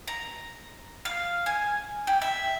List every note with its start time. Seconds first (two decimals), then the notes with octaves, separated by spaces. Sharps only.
0.07 A#5
1.05 F5
1.46 G#5
2.07 G4
2.22 E5